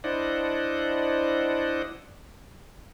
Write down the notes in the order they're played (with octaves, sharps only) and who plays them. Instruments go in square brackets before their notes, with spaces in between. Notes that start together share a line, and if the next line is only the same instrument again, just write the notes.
[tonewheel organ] D4 E4 C5 D5 D#5 F#5